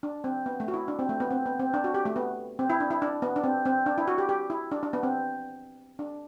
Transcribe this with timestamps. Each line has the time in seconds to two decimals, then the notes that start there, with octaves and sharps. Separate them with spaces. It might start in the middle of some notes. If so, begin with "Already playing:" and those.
0.03 D4
0.24 C4
0.46 B3
0.60 A3
0.68 F#4
0.74 E4
0.88 D4
0.99 C4
1.09 A3
1.20 B3
1.31 C4
1.46 B3
1.60 C4
1.74 D4
1.84 F#4
1.94 G4
2.05 A3
2.16 B3
2.59 C4
2.70 E4
2.80 D4
2.91 E4
3.02 D4
3.22 B3
3.36 D4
3.44 C4
3.65 C4
3.86 D4
3.98 E4
4.08 F#4
4.18 G4
4.29 G4
4.50 E4
4.72 D4
4.83 D4
4.93 B3
5.03 C4
5.99 D4